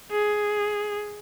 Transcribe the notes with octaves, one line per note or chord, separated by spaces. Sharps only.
G#4